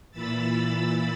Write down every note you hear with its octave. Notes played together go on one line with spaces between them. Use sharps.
A#2 E3 B5 E6 A6